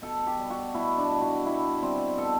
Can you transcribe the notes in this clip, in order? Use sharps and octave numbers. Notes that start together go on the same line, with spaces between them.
B2 A4
G4
G3
F#4
B2 E4
D4
G3
F#4
B2 E4
G3 C4
B2 A4